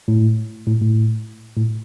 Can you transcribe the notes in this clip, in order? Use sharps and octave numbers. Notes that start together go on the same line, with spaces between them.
A2
A2
A2
A2